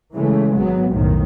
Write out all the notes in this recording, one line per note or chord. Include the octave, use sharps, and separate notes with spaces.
C#3 E3 G#3 A3
G#1 F#3 B3
B1 F2 A2 D#3